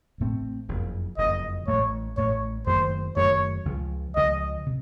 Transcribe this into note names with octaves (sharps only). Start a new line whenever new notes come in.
A1 A2 A3 C4
F#1 F2 C#3
F#1 F2 C#3 D#5
A1 A2 A3 C#5
A1 A2 A3 C#5
F#1 F#2 D#3 A3 C5
F#1 F#2 D#3 A3 C#5
C#2 C#3 F3
C#2 C#3 F3 D#5
C3